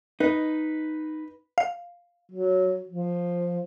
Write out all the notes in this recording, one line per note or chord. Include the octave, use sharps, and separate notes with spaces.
D#4 B4
F5
F#3
F3